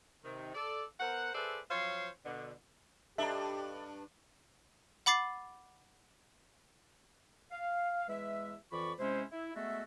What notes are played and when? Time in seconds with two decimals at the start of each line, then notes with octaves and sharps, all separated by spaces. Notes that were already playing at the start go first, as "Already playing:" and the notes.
0.25 C3 D#3
0.55 A4 D5
1.00 B3 A#4 C5 F#5
1.34 G#4 A4 B4 C5 D5 E5
1.71 F3 F#3 C4 C5 C#5 F5
2.25 B2 D3
3.18 G2 D4 G4 A4 D#5 E5 A5 A#5
5.06 F#5 B5 D6 A6 C7
7.51 F5
8.08 E2 G#3 B4 E5
8.71 F2 E3 F4 D5 B5 C#6
8.99 C3 G#3 C#4 E4 C5
9.32 E4
9.54 G#3 A3 B3 F#4 A4 E5